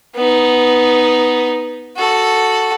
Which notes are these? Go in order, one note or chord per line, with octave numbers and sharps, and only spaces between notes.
B3 D#4
F#4 A4